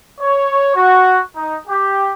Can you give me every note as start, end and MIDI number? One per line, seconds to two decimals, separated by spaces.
0.21 0.71 73
0.76 1.18 66
1.37 1.56 63
1.68 2.12 67